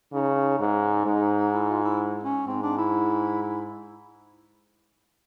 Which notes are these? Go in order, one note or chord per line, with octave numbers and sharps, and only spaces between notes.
C#3 D#4
D#4
G#2
G#2
E4
F4
E4
C#4
G#2 C4
D4
E4
E4